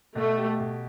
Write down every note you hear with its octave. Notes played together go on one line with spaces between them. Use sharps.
B2 A3
G4
B2